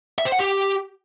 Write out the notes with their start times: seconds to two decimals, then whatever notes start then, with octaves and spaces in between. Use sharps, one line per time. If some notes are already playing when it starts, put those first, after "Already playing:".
0.18 E5
0.25 C5
0.32 F#5
0.39 G4